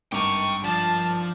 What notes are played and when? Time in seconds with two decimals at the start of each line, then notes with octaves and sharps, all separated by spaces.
0.12 G#1 G2 G5 A#5 C#6 D6
0.64 F3 D4 A5